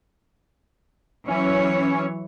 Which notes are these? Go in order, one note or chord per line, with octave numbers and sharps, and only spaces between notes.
E3 F#3 C#4 C#5